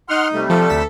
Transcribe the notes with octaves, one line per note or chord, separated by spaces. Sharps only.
D#4 F#5 C6 F6
C3 G3 A3
F3 A4
D2 B6 E7